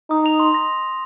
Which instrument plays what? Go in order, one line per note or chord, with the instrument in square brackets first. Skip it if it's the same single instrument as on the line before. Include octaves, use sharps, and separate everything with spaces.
[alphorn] D#4 [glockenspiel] D#6
[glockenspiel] F7
C6
A#6